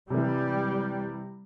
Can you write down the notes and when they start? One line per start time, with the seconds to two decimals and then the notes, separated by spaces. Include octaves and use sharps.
0.10 C3 E3 G3